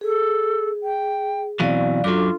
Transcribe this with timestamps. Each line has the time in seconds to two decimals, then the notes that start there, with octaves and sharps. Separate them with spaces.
0.01 G#4 A4
0.83 G5
1.60 B2 E3 F#3 C4 D5 F5
2.04 F#2 F#3 D4 F4 A4 D6